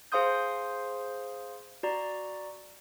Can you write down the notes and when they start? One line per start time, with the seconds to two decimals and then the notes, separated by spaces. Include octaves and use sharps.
0.12 G#4 C5 F5 C6 D#6 G6
1.83 F#4 D5 A#5